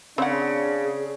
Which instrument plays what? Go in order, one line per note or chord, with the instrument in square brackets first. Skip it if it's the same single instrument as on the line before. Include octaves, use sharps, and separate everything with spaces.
[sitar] C#3 [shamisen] C4 F#5 [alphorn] D4 [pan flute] G#4